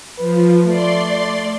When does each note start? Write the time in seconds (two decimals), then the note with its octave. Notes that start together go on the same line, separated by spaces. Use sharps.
0.19 F3 B4
0.66 A3 D5 C6